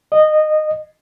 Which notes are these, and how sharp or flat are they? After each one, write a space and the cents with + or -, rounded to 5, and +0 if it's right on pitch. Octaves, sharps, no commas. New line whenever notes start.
D#5 -15